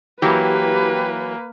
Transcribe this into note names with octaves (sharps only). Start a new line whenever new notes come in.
E3 F#3 A#3 G4 B4